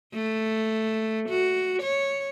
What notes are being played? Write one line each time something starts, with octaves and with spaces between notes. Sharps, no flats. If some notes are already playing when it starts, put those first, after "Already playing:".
A3
F#4
C#5